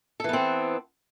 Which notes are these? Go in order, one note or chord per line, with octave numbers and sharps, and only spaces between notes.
E3 B3 C4 A4